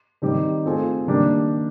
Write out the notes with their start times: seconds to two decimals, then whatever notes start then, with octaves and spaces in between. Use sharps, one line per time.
0.22 D#3 G3 C4 D#4 G4
0.65 A3 C4 F4 G#4
1.07 D#3 G3 A#3 D4 G4